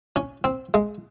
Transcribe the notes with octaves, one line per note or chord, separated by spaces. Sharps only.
C#4
C4
G#3